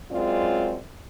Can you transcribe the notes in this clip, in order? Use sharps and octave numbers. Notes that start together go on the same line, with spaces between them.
F#2 G#3 C4 C#4 F4 D5